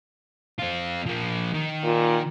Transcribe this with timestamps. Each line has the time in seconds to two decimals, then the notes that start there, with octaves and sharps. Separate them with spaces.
0.58 C4 F4
1.06 F3 A#3
1.54 D#3
1.84 A#2